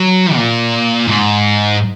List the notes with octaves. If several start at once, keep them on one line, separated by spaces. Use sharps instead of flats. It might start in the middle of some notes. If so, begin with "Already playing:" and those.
Already playing: F#3
A#2
G#2